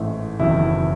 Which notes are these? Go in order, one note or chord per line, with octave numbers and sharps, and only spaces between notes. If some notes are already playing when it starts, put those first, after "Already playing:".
Already playing: A1 G#2 E3 A3
F#1 E2 D#3 F#3 E4